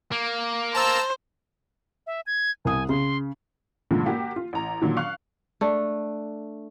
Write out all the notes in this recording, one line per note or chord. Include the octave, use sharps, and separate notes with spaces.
A#3
C5 A5 A#5 E6
E5
G#6
C2 G#5 D#6
C#3 C6
G2 A#2 D3 F3 G#3
A#3 F#4 G4
F4
A1 A#5
A#2 D3 D#3 F#3
F5 C#6 F#6
A3 D4